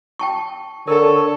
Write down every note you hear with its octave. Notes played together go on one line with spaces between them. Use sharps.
G5 A5 C#6
D3 A4 A#4 C#5 A5